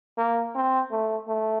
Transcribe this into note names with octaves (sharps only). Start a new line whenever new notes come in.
A#3
C4
A3
A3